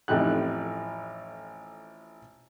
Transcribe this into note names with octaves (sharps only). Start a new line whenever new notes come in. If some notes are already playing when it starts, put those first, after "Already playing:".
A1 F2 A2 D#4 G4 F#6